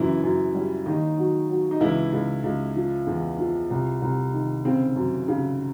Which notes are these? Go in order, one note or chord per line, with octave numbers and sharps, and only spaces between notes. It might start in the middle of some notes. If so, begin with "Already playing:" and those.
Already playing: F#2 C#3 E3 E4
F#2
G3
D#2 D#3 D#4
F#3
F#3
D#4
C#2 E3 E4
C#2
C#2
F3
E2
F3
C2
C2
D#3
C#3 C4
F#2
C#3